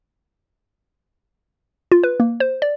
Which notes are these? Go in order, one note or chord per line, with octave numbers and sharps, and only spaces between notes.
F4
B4
A#3
C5
D5